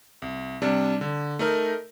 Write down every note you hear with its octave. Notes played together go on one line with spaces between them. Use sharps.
C2
C3 G3 D4
D3
A3 D#4 A#4